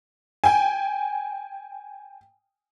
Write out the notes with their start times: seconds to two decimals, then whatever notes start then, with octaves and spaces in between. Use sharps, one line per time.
0.44 G5 G#5